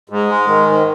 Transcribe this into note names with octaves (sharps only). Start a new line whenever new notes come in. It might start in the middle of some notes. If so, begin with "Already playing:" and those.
G#2
G#3
D#3
G#2